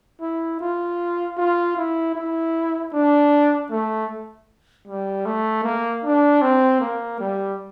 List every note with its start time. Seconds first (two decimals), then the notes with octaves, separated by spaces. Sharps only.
0.21 E4
0.61 F4
1.38 F4
1.77 E4
2.15 E4
2.93 D4
3.71 A3
4.88 G3
5.26 A3
5.64 A#3
6.04 D4
6.42 C4
6.81 A#3
7.20 G3